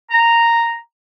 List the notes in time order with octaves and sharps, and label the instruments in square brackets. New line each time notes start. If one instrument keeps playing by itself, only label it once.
[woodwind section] A#5